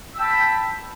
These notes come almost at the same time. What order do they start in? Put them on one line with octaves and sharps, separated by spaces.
E6 G5 A5 B5